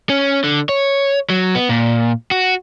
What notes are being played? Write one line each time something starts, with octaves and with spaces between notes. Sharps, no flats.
C#4
D3
C#5
F#3
B3
A#2
F#4